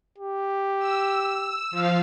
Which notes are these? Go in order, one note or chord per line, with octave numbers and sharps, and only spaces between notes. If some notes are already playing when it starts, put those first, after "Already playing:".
G4
E6
F3 F5